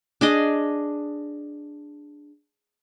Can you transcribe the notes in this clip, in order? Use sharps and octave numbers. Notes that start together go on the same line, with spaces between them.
D4 G#4 D#5